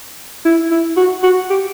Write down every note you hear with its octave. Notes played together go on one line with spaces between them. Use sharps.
E4
E4
F#4
F#4
G4